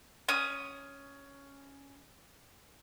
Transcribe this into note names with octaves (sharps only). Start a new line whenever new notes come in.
C#4 D#6